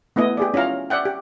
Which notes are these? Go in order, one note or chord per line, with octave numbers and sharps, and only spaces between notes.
A3 B3 E4 D#5
G4 G#4 D5
C#4 E4 F4 F5 A#5
D5 E5 F#5 G5
G4